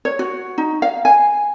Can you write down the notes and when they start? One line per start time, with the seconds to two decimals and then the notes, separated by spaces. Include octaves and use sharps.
0.05 C#5
0.19 F#4
0.58 D#4
0.82 F5
1.05 G#5